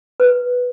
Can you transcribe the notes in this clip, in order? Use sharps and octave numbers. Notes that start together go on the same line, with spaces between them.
B4